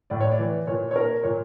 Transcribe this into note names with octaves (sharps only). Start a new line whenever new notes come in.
A2 D5
C#5
D5
E3
A#2 C#5
C#5
A#4
A#2 C#5